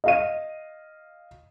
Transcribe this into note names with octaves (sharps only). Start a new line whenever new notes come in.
D#5 F5 D#7